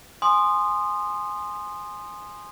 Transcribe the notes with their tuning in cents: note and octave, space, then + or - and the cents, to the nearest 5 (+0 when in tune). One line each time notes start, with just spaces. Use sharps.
G#5 +0 C6 +0 D#6 -20